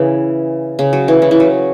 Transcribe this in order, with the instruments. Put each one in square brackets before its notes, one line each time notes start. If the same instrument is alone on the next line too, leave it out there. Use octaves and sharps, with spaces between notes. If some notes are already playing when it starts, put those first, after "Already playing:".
Already playing: [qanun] C#3 E3
C#3
F#3
E3
C#3
E3
F#3